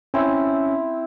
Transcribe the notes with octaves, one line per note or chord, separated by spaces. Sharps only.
C4 C#4 E4